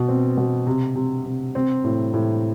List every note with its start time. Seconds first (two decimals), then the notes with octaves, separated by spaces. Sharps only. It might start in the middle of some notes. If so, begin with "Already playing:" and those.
Already playing: B2
0.08 C4
0.37 B2
0.67 C3
0.96 C3
1.26 C3
1.55 C4
1.84 A2
2.14 A2